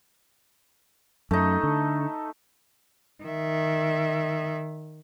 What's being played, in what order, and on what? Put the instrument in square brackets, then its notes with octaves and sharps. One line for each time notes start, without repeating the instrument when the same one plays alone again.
[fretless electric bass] F#2 [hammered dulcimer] A3 D#4
[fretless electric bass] D3
[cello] D#3 E5